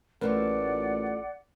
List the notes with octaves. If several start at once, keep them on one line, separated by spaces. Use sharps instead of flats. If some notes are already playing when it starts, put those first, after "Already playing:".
A1 A3 A#3 F4 A#4 B4 D5 F#5